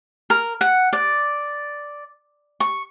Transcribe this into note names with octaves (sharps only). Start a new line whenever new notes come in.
A#4
F#5
D5
C#6